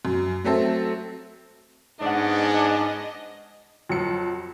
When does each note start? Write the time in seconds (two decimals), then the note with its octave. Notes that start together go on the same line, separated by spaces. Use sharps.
0.05 F#2
0.44 F#3 A3 C4 A4
2.01 G#2 B3 C#4 D4 D5 D#5 F#5
3.89 F2 F#3 C#7